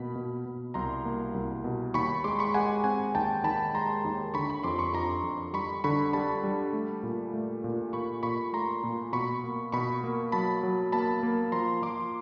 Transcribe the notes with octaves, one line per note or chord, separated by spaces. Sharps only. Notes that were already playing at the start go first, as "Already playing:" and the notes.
Already playing: B2 A#3 B5
B2
B2
C2 A#5 C6
A#3
C2
B2
D#2 B5 C#6
G#3 C6 D6
B5 C#6
G#3 F#5 G#5
C4 F#5 G#5
D#2 G5 A5
D#3 A5 B5
G#3 A#5 C6
D#2
D3 B5 C#6
B5 C#6
F2 C6 D6
B5 C#6
F2 A#5 C6
F2
G3 B5 C#6
D3 B5 C#6
G3 A5 B5
G3
A3
A#2
A3
A#2
A#2 B5 C#6
A#2 B5 C#6
A3 A#5 C6
A#2
B2 B5 C#6
A#3
B2 B5 C#6
A#3
F#3 A5 B5
F#3
A#3 A5 B5
A#3
F3 A#5 C6
F3 C6 D6